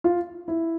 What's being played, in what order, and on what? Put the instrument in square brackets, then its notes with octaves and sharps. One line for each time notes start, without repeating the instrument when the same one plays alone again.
[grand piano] F4
E4